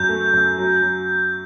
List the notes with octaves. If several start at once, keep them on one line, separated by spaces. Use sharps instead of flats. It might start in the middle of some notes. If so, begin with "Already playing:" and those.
Already playing: F#2 F#3 G6
A3
F#2
F#3
F#3